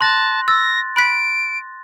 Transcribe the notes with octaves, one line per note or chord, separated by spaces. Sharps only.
A5 C6 F#6 A#6
E6 A6 A#6
B5 F#6 B6 D7